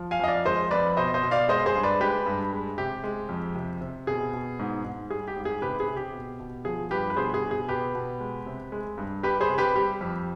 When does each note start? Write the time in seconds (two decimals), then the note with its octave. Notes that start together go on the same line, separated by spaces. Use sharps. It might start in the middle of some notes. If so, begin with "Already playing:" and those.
Already playing: F3
0.11 F5 G#5
0.20 F2 D#5
0.28 D5 F5
0.45 G#3 C5 D#5
0.71 F2 B4 D5
0.97 B2 C5 D#5
1.14 C5 D#5
1.23 B2
1.31 D5 F5
1.48 G#3 C5 D#5
1.66 G#4 C5
1.75 G2
1.83 B4 D5
2.00 G#3 G4 B4
2.26 G2
2.53 G#3
2.78 C3 G4
3.04 G#3
3.29 F2
3.55 C3
3.81 C3
4.07 B2 G#4
4.33 B2
4.59 G#2
4.85 G#2
5.10 G3 G#4
5.28 G4
5.36 G#2
5.45 G#4
5.62 C3 G4 B4
5.80 G#4
5.88 C3
5.97 G4
6.13 B2
6.40 B2
6.65 F3 G#4
6.91 G2 G4 B4
7.10 B4
7.16 B2 G#4 C5
7.34 G#4
7.42 B2
7.51 G#4
7.68 B2 G4 B4
7.95 B2
8.21 G#3
8.46 C3
8.72 G#3
8.98 G2
9.23 G3 G4 B4
9.41 G#4 C5
9.49 C3
9.58 G4 B4
9.75 G3 G4
10.01 F2